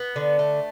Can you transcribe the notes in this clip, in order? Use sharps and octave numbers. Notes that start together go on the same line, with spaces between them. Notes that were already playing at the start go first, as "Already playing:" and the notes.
Already playing: B3
D3
A3